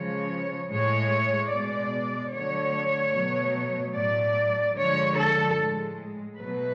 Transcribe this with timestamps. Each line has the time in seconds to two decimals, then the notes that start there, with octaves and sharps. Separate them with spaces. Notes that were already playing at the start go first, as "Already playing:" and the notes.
Already playing: C#3 F3 G#3 C#5
0.71 A2 G#3 C#5
1.52 B2 G#3 D5
2.32 D3 F#3 A3 C#5
3.13 B2 F#3 A3
3.94 A2 F#3 A3 D5
4.76 D3 F3 G#3 C#5
5.16 A4
5.56 A2 G#3
6.37 B2 F#3 A3 B4